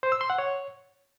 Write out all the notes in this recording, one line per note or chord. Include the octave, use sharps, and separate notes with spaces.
C5
E6
C6
F#5
C#5